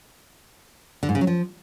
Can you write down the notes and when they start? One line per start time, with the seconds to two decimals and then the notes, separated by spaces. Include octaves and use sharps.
1.03 D3
1.09 G#2
1.15 C#3
1.21 F#3
1.27 F3